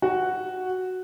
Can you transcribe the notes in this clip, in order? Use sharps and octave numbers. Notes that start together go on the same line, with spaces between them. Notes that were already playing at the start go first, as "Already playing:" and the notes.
F#4